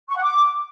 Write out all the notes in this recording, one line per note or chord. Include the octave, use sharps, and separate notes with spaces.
C#6
F#5
D6